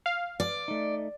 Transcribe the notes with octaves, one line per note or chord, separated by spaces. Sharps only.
F5
D5
A3 D#4